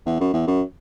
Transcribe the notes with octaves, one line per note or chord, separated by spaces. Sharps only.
E2
F#2
E2
F#2